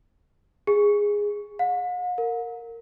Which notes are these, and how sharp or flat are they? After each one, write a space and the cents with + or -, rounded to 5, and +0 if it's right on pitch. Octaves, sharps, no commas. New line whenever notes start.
G#4 -10
F#5 -45
A#4 -15